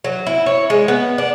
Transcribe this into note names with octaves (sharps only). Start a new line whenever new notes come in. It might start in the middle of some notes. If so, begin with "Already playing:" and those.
F#3
E4
C#5
G#3
B3
D4